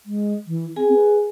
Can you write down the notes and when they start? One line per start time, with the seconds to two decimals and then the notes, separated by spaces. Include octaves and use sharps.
0.06 G#3
0.47 E3
0.76 C4 G#4 G#5
0.94 B4